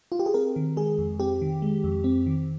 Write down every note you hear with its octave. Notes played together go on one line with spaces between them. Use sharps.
F4
G4
G#4
C4 A#4
D#3
G#3 G#4
F2
C4 G4
D#3
G#3
F2
C4
D#3